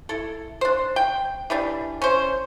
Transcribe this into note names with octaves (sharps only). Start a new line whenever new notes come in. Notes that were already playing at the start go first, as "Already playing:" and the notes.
E4 A4
D4 C5
G5
E3 G3 D4
C#4 C5